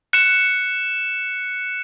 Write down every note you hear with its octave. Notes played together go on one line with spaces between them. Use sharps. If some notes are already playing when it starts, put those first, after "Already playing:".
F#6 C#7 E7